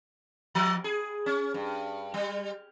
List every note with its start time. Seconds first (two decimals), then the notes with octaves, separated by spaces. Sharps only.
0.55 F3
0.84 G#4
1.26 C#4
1.54 G2
2.14 G3